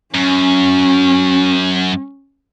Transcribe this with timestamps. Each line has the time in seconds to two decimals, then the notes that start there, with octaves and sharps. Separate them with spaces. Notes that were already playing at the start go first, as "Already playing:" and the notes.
0.15 F#2 C#4